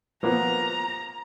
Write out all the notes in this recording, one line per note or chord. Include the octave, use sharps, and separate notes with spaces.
F3 A#3 B3 A#5